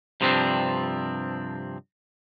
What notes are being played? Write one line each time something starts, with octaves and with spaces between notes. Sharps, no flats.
G2 C3 F3 G3 C4 D4